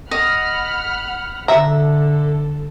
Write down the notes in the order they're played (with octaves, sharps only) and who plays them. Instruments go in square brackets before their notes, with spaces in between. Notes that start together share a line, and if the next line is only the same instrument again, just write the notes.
[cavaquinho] D#5 [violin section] F#5 B5 F6
[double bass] D3 [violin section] A4 [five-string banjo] E5 A#5